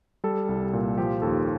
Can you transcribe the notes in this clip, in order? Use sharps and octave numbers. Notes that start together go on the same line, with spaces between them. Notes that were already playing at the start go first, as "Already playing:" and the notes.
G3 A4
C2
A#2
F3 G4
D#2 A4